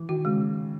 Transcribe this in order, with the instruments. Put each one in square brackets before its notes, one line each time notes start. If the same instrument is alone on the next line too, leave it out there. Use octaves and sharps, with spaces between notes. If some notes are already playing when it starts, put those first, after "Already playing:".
Already playing: [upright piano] E3
[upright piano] D#3 [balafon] F#4
[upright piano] C#3 [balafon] G#3